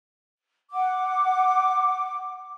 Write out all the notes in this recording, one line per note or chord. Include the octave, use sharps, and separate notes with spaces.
F#5 D6